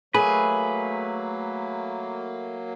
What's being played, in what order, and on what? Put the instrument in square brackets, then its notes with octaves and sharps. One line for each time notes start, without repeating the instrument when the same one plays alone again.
[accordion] F#3 A#3 [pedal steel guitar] A3 B4 [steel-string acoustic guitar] G#4